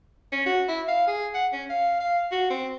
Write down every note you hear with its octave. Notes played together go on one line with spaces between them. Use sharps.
C#4
F#4
E4
F5
G#4
F#5
C#4
F5
F5
F#4
C4